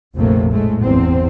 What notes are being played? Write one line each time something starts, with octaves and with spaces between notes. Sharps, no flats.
F1 A#1 F2 C3 A3 A#3
A2 G#3 A3
G1 E2 C4